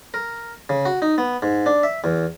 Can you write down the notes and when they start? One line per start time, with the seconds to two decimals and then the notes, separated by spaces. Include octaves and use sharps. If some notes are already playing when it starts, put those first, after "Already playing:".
0.14 A#4
0.69 C#3
0.85 F#4
1.02 D#4
1.18 B3
1.42 G#2
1.66 D4
1.83 E5
2.04 E2